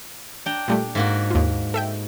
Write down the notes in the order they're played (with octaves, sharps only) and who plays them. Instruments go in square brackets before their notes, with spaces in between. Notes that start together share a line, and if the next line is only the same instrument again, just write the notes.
[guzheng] D4 G5 A#5
[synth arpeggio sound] A#2 G3 A3
[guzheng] G#2 A#3 F#4
[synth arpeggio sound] D#2 F4
A4 E5 G5